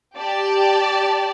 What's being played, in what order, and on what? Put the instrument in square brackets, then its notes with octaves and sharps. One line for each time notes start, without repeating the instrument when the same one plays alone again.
[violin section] G4 D5 A5